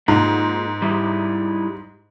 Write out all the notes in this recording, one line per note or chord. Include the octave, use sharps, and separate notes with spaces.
G#2 A#3 D#4 F4
G3 D#4 E4